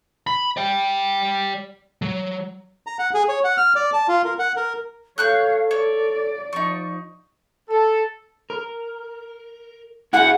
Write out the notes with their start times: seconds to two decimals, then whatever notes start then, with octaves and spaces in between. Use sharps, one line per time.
0.27 B5
0.57 D5 G5
2.02 F#3
2.87 A#5
2.99 F#5
3.14 G#4
3.29 C#5
3.44 F#5
3.57 F6
3.75 D5
3.93 A5
4.08 F4
4.25 A#4
4.39 F#5
4.56 A#4
5.18 A4 C#5 F5 C#6 F#6 G6
5.71 C#5 D5
6.53 F3 D#4 C#6
7.70 A4
8.50 A#4
10.13 E4 F#4 G#4 F#5